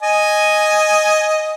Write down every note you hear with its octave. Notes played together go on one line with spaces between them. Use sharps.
D#5 G#5